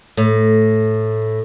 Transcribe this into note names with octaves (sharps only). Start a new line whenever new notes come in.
A2